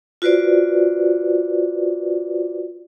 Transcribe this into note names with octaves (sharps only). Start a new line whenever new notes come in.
F4 F#4 B4 C5 D5